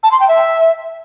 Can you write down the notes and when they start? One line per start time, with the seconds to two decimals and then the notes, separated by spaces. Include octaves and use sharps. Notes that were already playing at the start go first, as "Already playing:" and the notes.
0.03 A5
0.12 C6
0.20 G5
0.28 E5